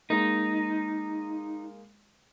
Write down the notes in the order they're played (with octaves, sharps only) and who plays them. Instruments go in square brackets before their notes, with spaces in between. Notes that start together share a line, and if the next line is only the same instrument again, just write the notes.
[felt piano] G#3 A#3 [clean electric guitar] D#4